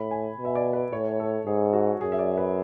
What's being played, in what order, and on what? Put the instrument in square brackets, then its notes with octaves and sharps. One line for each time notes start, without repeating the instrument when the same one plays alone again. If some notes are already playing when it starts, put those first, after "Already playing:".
Already playing: [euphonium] A2 [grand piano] B5
[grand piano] G#5
[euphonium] B2
[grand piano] E5
D5
B4
[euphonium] A2 [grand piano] C#5
[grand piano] A4
[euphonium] G#2 [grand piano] G#4
[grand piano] F#4
[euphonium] F#2 [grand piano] G#4
[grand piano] E5
D5
B4